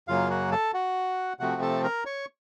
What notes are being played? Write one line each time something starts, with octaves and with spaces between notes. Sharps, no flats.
F#2 C#3 F#3 A#3 F4 F5
F#4 F#5
A4 A5
F#4 F#5
C3 F3 A3 C4 F#4 F#5
A4 A5
A#4 A#5
C#5 C#6